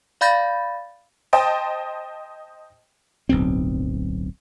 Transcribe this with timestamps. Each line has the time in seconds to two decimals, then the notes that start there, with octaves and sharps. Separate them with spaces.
0.21 D5 F5 B5 G6 A6 A#6
1.33 C5 D#5 G5 A5 D#6
3.29 D1 B1 G2 C4